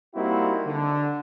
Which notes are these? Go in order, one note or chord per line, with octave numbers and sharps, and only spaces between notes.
G3 A#3 C4 D#4 E4 F#4
D3